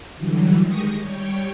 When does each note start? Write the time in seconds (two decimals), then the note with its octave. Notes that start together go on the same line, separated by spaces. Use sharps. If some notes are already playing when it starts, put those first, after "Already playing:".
0.16 D3 E3 F#3 G3
0.60 D#3 G#3 G4 C#6 D#6 A#6
0.99 G3 C#5 G5